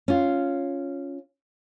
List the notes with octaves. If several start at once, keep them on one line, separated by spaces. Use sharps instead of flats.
C#4 F4